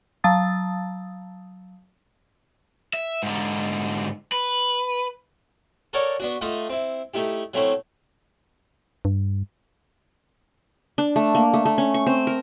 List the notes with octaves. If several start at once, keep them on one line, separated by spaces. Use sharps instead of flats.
F#3 F5 A5 D#6 A6
E5
G#2 D3
B4
A4 A#4 C#5 D5 F#5
B3 D4 F#4
A3 D#4 F4 D#5 F#5
C4 E4
A3 D#4 E4 G4
F#3 A3 C4 C#4 E4
G2
D4
A3
A#3
A3
A3
C#4
C#6
C4
A#4